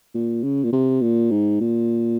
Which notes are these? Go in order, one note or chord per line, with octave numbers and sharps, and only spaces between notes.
A#2
C#3
A#2
C3
A#2
G#2
A#2